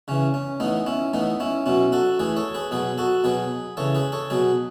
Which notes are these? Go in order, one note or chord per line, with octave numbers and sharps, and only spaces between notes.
C#3 E3 C#4
C#4
A2 E3 B3 D#4
C#4 E4
A2 E3 B3 D#4
C#4 E4
B2 F#3 C#4 E4
F#4 A4
A2 E3 G#4 B4
A4 C#5
G#4 B4
B2 F#3 G#4 B4
F#4 A4
B2 F#3 G#4 B4
C#3 E3 A4 C#5
G#4 B4
A4 C#5
B2 F#3 G#4 B4